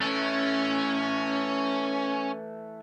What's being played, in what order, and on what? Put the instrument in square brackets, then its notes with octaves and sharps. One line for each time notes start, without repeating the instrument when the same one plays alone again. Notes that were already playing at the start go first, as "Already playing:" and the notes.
[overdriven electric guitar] E3 A3 [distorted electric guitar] C#4